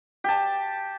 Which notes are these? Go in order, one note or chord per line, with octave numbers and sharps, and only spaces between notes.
G4 A5